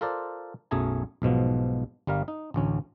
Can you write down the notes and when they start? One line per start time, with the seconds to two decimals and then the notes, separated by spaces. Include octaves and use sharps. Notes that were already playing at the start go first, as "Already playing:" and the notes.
0.01 F4 A4 A#4 C5 D5
0.71 B1 F#2 A3 G#4 G#5 A#5
1.22 B1 G#2 B2 F3
2.07 G1 G3 A#4 F5
2.28 D#4
2.54 A1 D2 C#4